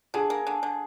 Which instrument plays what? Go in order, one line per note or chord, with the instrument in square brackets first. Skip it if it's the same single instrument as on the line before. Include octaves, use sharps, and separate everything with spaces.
[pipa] D3 [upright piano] G#4
[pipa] A#3
D3
D3